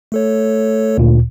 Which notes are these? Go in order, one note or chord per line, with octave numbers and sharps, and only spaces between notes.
A3 A4 C#5
D2 A#2